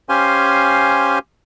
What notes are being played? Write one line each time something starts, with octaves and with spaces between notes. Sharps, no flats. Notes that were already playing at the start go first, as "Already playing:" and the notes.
C#4 G4 C5 F5 G#5 C6